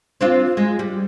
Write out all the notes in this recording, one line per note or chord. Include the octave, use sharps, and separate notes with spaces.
C4 D4 F4
G#3
G3